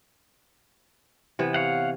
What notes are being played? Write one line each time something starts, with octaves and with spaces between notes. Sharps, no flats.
C3 E3 B3
C#5 F5 F#5